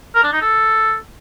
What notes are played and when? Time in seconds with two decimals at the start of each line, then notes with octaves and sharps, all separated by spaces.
0.15 A#4
0.24 D4
0.33 D#4
0.41 A4